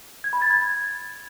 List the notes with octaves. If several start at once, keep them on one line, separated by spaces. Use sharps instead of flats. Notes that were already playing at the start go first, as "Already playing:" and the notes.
G#6
B5
A6
G#6